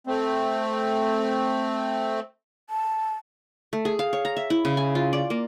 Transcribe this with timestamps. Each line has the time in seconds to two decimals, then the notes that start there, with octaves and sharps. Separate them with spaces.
0.07 A3 C4
2.70 A5
3.73 A3
3.85 G#4
3.99 F5
4.13 C#5
4.25 A#5
4.37 E5
4.50 E4
4.65 C#3
4.77 G#5
4.95 F4
5.13 D5
5.30 A#3